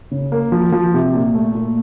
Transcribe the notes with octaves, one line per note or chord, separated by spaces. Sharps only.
C#3
A#3
F3
F3
C3
A#2
A3
A#2